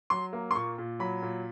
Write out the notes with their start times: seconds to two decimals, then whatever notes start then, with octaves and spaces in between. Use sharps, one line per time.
0.10 F#3 C6
0.33 A#3
0.51 C6
0.55 A#2 C#6
0.78 A#2
0.99 F#3 B5
1.22 A#2